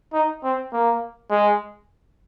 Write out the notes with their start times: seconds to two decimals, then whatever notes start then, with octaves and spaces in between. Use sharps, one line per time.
0.13 D#4
0.44 C4
0.73 A#3
1.30 G#3